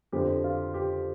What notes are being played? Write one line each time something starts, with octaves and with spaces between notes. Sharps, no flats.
F2 D3 F3 G4
F4
G4